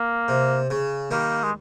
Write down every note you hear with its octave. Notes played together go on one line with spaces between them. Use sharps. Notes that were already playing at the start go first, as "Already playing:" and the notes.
Already playing: A#3
C3
C#3
D#3 G3 A#3
G#3